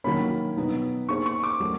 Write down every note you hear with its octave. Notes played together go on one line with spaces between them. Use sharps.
D#3 F#3 A#3 C#4 B5
B2 F#3 B3 D#4
A#3 D#4 G#4 C5 C#6
C#6
D6
F#3 A3 C#4 F#4 A#4